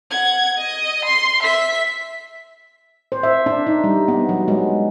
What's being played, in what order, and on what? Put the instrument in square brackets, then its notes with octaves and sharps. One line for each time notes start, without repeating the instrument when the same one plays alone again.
[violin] F#5 G#6
D#5
C6
E5 B6
[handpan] C5
E5
D4
D#4
G3
B3
F#3
G#3